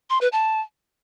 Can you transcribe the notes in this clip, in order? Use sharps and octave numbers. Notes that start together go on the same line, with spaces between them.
C6
B4
A5